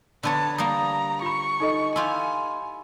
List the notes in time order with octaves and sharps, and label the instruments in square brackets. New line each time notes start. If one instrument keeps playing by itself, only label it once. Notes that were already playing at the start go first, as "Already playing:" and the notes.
[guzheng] D3 B3 C#5 [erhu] A5
[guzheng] G3 A#3 [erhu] A#5 [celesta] D#6
[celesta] F4 B5 [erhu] C#6
[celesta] D#4 A4 D#5
[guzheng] E4 F4 G4 [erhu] G#5